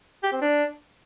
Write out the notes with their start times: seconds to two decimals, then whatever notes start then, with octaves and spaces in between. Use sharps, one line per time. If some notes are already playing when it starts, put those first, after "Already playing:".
0.23 G4
0.32 C4
0.41 D4